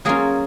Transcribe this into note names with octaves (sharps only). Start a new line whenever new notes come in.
F#3 A#3 C#4 F4 G#4